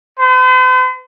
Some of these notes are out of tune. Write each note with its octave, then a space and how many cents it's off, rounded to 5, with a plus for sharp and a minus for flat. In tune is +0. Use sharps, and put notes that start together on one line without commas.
C5 -45